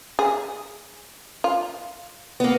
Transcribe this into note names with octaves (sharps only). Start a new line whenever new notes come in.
G#4
F4
A#3 B3